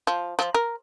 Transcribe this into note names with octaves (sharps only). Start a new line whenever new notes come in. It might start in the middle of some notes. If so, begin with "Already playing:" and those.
F3
F3
A#4